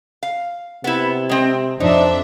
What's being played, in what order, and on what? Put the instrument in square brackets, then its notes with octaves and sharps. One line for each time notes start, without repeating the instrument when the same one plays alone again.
[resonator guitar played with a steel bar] F5
[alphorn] C3 [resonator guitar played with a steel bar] B3 E4
[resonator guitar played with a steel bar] G#3 C4
[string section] F2 D4 E5 [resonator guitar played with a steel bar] D#4 [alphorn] C5